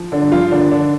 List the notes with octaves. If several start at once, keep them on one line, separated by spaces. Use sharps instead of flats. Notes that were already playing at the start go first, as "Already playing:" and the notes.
Already playing: F3
D3 D4
G2
F3 F4
D3 D#3 D4
D3 D4